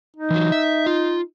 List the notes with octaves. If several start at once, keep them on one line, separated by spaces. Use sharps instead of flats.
D#4
E3 F#3
E5
F4